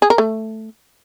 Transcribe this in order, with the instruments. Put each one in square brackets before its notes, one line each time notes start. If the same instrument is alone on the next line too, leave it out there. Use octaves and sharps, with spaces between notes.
[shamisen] G#4
A#4
A3